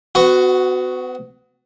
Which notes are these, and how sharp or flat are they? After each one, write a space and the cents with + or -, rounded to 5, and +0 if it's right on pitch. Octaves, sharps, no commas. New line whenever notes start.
B3 +40 F#4 +0